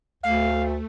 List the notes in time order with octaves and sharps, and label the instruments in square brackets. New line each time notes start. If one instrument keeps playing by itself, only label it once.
[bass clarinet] D2 [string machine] A3 [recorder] F5